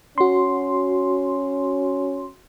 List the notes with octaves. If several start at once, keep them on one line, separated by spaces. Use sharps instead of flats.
C#4 F#4 C6